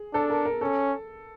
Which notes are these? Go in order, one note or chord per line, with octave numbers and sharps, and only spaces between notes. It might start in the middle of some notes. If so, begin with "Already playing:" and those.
Already playing: G#4
D4 A4
A#4
A#4
C#4 A4